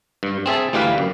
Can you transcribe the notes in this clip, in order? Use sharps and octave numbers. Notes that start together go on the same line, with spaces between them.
G2
C4 G#4 E5 A5
D2 E3 G3 G4 B4 F5
F#2